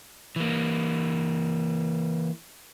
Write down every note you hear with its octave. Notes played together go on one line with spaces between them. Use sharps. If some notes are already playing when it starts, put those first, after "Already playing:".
E3 A#3